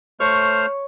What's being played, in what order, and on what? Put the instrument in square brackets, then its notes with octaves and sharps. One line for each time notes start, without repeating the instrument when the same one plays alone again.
[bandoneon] A3 C5 F6 [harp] C#5